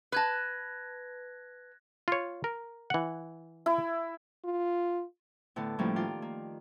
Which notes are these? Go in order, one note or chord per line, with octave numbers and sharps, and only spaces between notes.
B4 A5 F#6 G#6 A#6
F4 C#5
A#4
E3 F#5
E4
F4
A2 D3 B3
A2 F3 G3 A#3 C#4 G4
D#3 F4 D5 F5
A#3